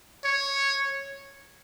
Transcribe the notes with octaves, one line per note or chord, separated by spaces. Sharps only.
C#5